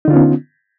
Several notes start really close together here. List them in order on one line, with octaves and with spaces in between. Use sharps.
D#4 D3 F4 C#4 B3